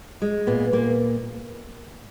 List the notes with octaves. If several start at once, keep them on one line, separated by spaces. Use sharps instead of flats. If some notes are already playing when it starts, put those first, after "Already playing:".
G#3
A#2 B3
A#2 A#3